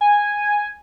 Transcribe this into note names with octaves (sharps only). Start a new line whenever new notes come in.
G#5